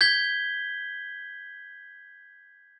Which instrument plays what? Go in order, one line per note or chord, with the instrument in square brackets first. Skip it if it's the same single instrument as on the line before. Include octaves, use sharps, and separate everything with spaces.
[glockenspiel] G6 G#6 B6 G7